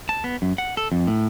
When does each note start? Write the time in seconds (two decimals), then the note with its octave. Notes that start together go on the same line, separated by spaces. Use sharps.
0.09 A5
0.24 B3
0.42 F#2
0.58 F#5
0.77 A4
0.92 F2
1.07 A2